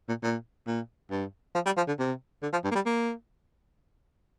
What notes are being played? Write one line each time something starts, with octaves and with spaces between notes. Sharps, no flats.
A#2
A#2
A#2
G2
F3
G3
F3
D3
C3
D3
F3
G2
A#3
G3
A#3